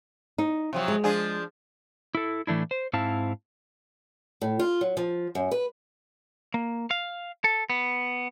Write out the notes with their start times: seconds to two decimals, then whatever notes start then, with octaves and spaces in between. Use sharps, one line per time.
0.38 D#4
0.73 C3 F3 F#3
0.88 G#3
1.04 F3 D4 G#4
2.15 E4 A4
2.47 A2 E3 A3 D4 E4
2.71 C5
2.93 G#2 C4 E4 F5 A5
4.41 A2
4.59 F4
4.81 F#3
4.97 F3
5.35 F#2
5.51 B4
6.54 A#3
6.91 F5
7.44 A4
7.70 B3